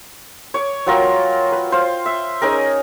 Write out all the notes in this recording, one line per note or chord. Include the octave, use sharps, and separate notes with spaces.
C#5 D6
F#3 F4 A#4 G5
B4
C5 F5
E5
C#4 D#4 G#4 A#4